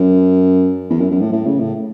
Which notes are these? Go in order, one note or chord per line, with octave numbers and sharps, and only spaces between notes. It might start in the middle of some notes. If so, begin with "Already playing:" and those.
Already playing: F#2
E2
F#2
F#2
A2
A2
C#3
A2